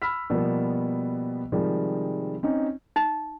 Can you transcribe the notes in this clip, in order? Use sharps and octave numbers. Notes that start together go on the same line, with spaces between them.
B5 E6 F6 B6
B2 F3 G3 A#3 B3
C3 D#3 F3 G3 G#3
C4 C#4 D#4
D#4